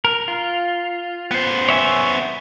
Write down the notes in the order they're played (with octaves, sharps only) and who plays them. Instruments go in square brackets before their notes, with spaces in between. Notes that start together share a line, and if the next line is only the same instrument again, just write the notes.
[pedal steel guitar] A#4
F4
[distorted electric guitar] B3 C5
[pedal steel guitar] C#5 E5 G#5